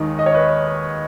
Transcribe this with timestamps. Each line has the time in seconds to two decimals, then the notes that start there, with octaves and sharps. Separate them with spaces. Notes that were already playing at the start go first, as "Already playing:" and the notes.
Already playing: D#2 D#3 G#3 D#4
0.19 D#5
0.26 C#5
0.34 B4 D#5